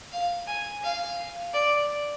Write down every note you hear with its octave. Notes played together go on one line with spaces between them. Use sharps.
F5
G#5
F5
D5